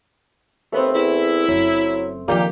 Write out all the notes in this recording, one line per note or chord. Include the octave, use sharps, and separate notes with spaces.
D#2 A3 B3 C4
E2 E4
F#1 F#2 F#3
A#2 D3 D#3 F3 A#3 D#4 G4